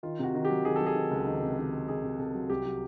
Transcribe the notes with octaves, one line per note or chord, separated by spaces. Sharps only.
D#3 F4
C3 F#4
D#3
G4
F#3
D#3 G#4
F#3 A4
G#4
D#3
C#2
D#3
C3
D#3
D#3
D#3 G#4
C3
C3 A4
F#3
C2 G4
F#3